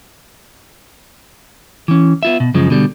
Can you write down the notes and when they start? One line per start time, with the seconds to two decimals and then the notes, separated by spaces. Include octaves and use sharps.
1.88 E3 C#4
2.23 B3 F4 E5
2.40 B2
2.54 F#2 C#3 F3 G#3
2.70 B2 D3 G3